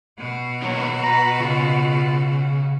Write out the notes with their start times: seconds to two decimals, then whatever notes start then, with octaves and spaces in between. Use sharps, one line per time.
0.19 B2 F#4
0.62 A#2 D#3 F#3 B3
1.04 B4 A#5
1.40 C#3 F4